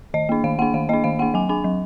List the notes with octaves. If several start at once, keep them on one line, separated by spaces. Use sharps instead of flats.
D#3 D#5
A#3 D4
D#3 F5
A#3 D4 F#5
D#3 F5
A#3 D4 D#5
D#3 F5
A#3 D4 F#5
F#3 G#5
D4 G#5
F#3